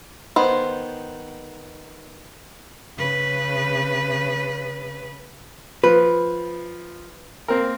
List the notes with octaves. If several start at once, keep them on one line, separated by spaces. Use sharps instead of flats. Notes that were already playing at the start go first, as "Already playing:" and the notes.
D#3 B3 C5
C#3 B4
F3 B4
A#3 C4 A#4